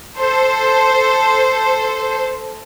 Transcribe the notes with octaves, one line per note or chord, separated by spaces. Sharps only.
A4 C5